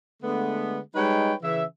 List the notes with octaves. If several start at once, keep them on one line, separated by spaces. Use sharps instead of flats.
D3 G#3 A3 B3
G3 G#3 D#4 B4 C#5 G5
C#3 E3 E5